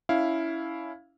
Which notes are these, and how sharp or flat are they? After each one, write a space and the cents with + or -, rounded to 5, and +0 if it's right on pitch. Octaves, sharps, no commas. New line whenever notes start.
C#4 +30 E4 +0 F5 +0